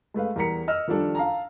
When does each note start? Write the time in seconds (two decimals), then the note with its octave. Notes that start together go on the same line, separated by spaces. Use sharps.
0.14 G#3 A3 B4 F5
0.36 E2 G3 A#4 A#5 B6 C#7
0.68 D#5 E6 F6
0.88 D#3 F3 G3 D4 A4
1.15 F5 A5 A#5